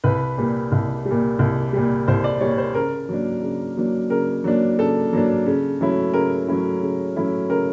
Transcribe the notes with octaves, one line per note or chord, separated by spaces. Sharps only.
C2 B4
A#2 G3
C2
G3
A#2
C2
A#2 G3
C2 C5
D5
A#2 G3 C#5
C5
C#3 A#4
F#3 A#3 D4
C#3
F#3 A#3 D4
C#3 A#4
F#3 A#3 D4
C#3 A4
F#3 A#3 D4
C#3
F#3 A3 C#4 E4
C#3 A#4
F#3 A3 C#4 E4
C#3
F#3 A3 C#4 E4
C#3 A#4